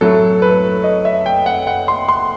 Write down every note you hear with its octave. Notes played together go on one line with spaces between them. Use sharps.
A2 F#3 A3 A4
B4
D#5
E5
G5
F#5
F#5
C6
C6